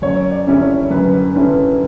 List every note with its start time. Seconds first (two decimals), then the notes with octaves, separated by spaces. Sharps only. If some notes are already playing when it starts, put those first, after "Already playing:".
0.02 F#2 C#5
0.31 D5
0.47 D3 G3 C#4 E4
0.62 C#5
0.90 F#2 B4
1.13 B4
1.35 D3 G3 C#4 E4 B4